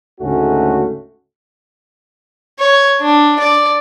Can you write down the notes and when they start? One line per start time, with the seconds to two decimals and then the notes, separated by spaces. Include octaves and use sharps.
0.21 D2 G#2 C#3 A3 C#4 F#4
2.59 C#5
3.01 D4
3.40 D5